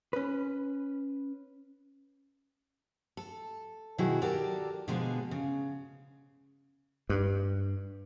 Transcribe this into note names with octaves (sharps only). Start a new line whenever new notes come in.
C#4 B4
A4
B2 D#3 F#3 E4 F#4 G#4
F#4 G4 A4 A#4 D5
B2 D3 F3 G3 G#3 B3
C#3
G2